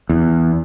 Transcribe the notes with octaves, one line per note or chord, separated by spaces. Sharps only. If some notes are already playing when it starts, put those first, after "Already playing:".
E2